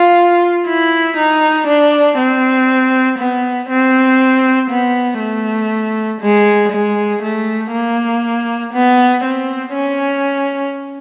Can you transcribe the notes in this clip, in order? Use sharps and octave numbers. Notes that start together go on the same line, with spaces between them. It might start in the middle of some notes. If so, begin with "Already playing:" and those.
Already playing: F4
E4
D#4
D4
C4
B3
C4
B3
A3
G#3
G#3
A3
A#3
B3
C4
C#4